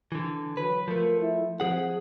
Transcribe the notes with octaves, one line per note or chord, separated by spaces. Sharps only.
D3 E3
F#3 B4
F3 A3 A#4
E4
F3 C4 G#4 F#5